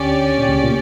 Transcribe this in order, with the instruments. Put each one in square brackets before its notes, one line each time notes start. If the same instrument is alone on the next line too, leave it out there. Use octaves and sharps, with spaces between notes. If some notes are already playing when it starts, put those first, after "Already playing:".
Already playing: [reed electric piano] D2 D3 [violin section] C#4 G4 D5
[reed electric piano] A#2
C#2 C#3
A#2